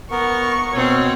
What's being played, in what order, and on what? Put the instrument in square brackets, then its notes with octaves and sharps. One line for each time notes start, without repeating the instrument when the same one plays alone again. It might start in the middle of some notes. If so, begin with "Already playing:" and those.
[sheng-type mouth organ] B3 A#4 [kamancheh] C#6
[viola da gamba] B2 C4 [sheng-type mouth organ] C#5